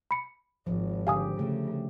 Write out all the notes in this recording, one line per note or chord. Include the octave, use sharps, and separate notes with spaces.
B5 C#7
G#1 F3
D3 G4 F5 G#5 D#6
C#3 A3